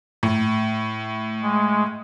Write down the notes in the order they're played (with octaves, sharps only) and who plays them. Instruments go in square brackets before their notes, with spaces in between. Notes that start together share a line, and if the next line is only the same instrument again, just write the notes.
[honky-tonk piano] A2
[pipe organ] G#3